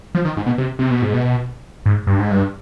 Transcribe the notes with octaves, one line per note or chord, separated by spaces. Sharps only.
F3
D#3
G#2
B2
C3
C3
B2
G#2
B2
G#2
G2
G#2
G2